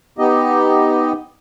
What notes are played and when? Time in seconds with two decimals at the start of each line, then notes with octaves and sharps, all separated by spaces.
0.18 B3 D#4 G4 D#5